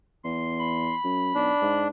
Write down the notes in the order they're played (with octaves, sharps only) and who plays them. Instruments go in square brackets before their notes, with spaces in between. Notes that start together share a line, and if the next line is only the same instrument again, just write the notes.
[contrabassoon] E2 [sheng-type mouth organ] C6
[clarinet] B5
[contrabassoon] F#2
[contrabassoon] B1 [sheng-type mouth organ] D4
[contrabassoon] G#2